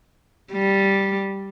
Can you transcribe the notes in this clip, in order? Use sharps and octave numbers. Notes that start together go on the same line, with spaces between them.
G3